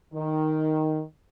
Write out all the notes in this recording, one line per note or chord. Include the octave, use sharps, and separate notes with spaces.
D#3